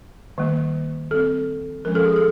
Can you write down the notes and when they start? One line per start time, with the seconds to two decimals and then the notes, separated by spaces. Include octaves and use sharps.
0.38 D#3 G3 A#3
1.11 G3 C4 A4
1.85 F3 G#3 C#4 A#4
1.95 A4
2.06 G#4
2.16 A4